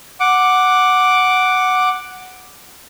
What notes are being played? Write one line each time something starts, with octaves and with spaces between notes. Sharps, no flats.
F#5 D6